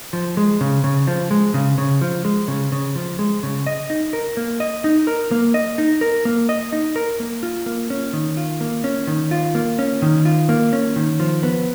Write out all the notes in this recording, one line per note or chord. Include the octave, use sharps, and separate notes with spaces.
F3
G#3
C#3
C#3
F3
G#3
C#3
C#3
F3
G#3
C#3
C#3
F3
G#3
C#3
D#5
D#4
A#4
A#3
D#5
D#4
A#4
A#3
D#5
D#4
A#4
A#3
D#5
D#4
A#4
A#3
F4
A#3
C#4
D#3
F4
A#3
C#4
D#3
F4
A#3
C#4
D#3
F4
A#3
C#4
D#3
F3
B3